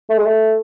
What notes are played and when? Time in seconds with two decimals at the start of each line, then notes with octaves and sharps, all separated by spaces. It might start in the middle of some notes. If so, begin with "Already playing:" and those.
0.10 A3
0.18 G#3
0.26 A3